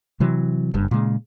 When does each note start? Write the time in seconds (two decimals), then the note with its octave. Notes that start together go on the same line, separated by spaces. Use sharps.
0.20 C3 E3 F#3
0.74 F#1 G2
0.91 A#2 C#3 G#3